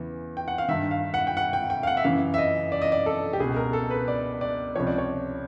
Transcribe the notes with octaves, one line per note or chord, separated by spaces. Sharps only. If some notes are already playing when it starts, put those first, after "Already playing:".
Already playing: E2 C#3 E3
G5
F#5
F5
G2 D#3 E5
F5
F#5
G5
F#5
G5
G5
F5
F#5
E5
F#2 C#3 E3 F5
E5
D#5
D5
D#5
D5
A4
G4
C#2 B2 G#4
A#4
A4
B4
D5
D5
C#2 C3 F3 C#5
D5
C#5